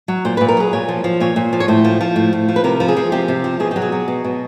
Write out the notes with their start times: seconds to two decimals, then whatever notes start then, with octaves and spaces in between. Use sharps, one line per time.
0.08 F#3
0.25 A#2 C5
0.37 A#2 B4
0.48 A#4
0.57 F#3 G#4
0.73 A#2 C#5
0.89 F3
1.04 F3
1.20 A#2 C#5
1.36 A#2
1.53 F3
1.60 C#5
1.68 A2 C5
1.85 F3
2.01 F3
2.16 A2
2.33 A2
2.49 F3
2.56 B4
2.64 C3 A#4
2.80 F3
2.88 G#4
2.97 F3
3.12 C3 G4
3.28 C3
3.44 F3
3.60 B2 G#4
3.71 F#3 G4
3.82 G#4
3.92 F#3
4.08 B2
4.24 B2